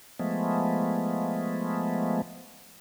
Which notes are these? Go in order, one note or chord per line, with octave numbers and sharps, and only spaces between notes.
F3 G#3 A3 B3